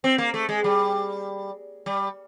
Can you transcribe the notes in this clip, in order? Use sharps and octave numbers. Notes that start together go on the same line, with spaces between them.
C4
A#3
A3
G#3
G3
G3